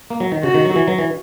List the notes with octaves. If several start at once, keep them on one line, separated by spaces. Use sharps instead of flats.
A#3
F#3
D#3
C#3 F#4
D#3
F#3
E3
F#3
E3